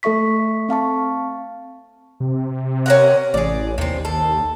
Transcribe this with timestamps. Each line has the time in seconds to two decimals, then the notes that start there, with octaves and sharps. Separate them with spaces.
0.03 A3 A4 E5 C#6 B6
0.69 C4 F5 A5 C#6
2.20 C3
2.86 C#4 A#4 F#5
3.34 A1 G#4 D5
3.78 D#2 C3 C4
4.05 A4